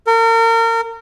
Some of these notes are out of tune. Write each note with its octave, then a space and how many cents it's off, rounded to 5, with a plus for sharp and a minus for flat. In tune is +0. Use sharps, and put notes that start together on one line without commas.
A#4 -35